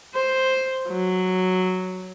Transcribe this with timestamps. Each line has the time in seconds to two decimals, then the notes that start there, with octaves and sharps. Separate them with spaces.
0.14 C5
0.88 F#3